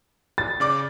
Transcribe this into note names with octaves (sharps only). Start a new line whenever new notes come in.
A6
C#3 D5 D6